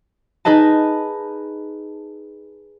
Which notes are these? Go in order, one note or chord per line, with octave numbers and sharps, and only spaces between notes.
D#4 G#4 B4 D#5 A5